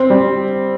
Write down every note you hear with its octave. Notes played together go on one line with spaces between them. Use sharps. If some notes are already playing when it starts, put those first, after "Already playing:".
Already playing: C4
G3